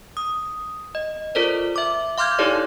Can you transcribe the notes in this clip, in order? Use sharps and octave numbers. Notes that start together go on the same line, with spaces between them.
D#6
D#5
F4 A4 A#4 C5 D5
E5 D6
F5 C6 D6 F6 G6 G#6
D#4 E4 G4 A4 C#5 D5